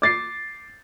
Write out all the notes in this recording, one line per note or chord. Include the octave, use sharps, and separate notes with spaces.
D6 A6 C7